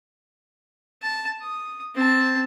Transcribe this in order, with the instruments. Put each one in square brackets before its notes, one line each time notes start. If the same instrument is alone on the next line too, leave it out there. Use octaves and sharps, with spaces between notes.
[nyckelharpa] A5
D#6
C4 A5